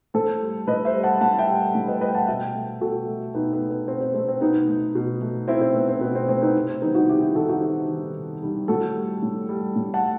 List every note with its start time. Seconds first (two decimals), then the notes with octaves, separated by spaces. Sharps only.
0.14 A2 A4 C5
0.41 G3
0.68 A2 B4 D#5
0.85 C5 E5
0.95 G3
1.03 F#5 A5
1.21 A2 F#5 A5
1.39 E5 G5
1.47 G3
1.75 A2
1.88 B4 D#5
2.01 G3 B4 D#5
2.08 G5
2.15 F#5 A5
2.27 B2 E5 G5
2.55 A3
2.81 B2 F#4 A4
3.07 A3
3.34 B2 B3 D#4
3.53 B3
3.61 A3
3.71 B3
3.88 B2 C4
4.01 C4
4.14 A3 C4
4.28 C4
4.41 B2 B3 D#4
4.68 A3
4.95 B2
5.22 A3
5.48 B2 C4 E4
5.62 C4
5.74 A3 B3
5.89 C4
6.01 B2 B3
6.15 C4
6.29 A3 C4
6.42 B3 D#4
6.55 C3
6.69 C4
6.82 D#3 G3 B3 D#4
6.95 D#4 F#4
7.09 C3 E4 G4
7.22 E4 G4
7.35 D#3 G3 F#4 A4
7.49 D#4 F#4
7.61 C3
7.88 D#3 G3
8.15 C3
8.43 D#3 G3
8.68 A2 F#4 A4
8.96 G3
9.23 A2
9.49 G3
9.76 A2
9.94 F#5 A5
10.02 G3